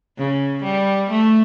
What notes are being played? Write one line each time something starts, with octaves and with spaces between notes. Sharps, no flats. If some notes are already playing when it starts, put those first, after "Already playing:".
C#3
G3
A3